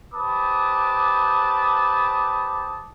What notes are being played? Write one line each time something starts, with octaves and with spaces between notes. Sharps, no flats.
G4 B4 C5 A5 D6 D#6